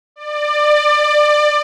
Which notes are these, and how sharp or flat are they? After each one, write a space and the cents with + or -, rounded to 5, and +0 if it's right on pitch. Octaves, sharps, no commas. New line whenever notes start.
D5 +25